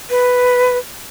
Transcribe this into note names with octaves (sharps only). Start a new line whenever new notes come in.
B4